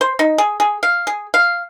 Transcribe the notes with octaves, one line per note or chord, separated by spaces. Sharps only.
C5
D#4
G#4
G#4
F5
G#4
F5